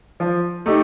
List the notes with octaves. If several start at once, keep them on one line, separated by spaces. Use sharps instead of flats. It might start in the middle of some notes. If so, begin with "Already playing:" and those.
F3
A3 D#4 G4